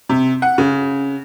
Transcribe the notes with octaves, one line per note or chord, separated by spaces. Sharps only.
C3
F#5
C#3